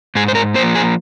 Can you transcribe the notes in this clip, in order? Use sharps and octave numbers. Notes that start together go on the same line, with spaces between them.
G#2 G#4
C5
A#4
F3 A#3 C5
G#4